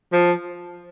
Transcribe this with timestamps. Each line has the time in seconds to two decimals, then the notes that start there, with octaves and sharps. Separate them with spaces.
0.13 F3